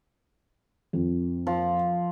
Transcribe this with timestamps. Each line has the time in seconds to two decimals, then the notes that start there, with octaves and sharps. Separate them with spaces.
0.93 F2
1.47 F3